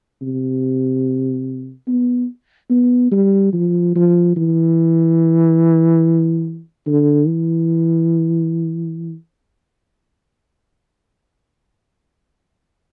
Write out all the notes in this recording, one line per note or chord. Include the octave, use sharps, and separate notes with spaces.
C3
B3
B3
G3
F3
F3
E3
D3
E3